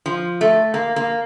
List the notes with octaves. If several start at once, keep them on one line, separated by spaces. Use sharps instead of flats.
F3
A3
A#3
A#3